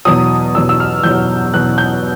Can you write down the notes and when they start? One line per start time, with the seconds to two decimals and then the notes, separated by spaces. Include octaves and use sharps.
0.05 E2 B2 F#3 D#6
0.55 E2 B2 F#3 E6
0.69 E6
0.80 F6
1.04 E2 B2 F#3 G6
1.54 E2 B2 F#3 F#6
1.78 G6